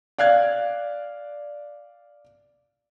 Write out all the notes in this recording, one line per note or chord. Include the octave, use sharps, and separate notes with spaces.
D5 F5 F#6 G#6